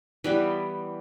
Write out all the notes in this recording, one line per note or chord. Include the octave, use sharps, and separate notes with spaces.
E3 G3 B3